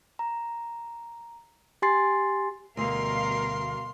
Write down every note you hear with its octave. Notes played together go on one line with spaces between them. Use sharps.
A#5
G4 G#5 C6 A6 C7
D2 B2 G3 A#4 F5 C6